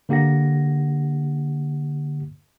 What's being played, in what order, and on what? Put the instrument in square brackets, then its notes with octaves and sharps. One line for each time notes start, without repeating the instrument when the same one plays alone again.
[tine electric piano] D3 A#3 G4 F#5 A#6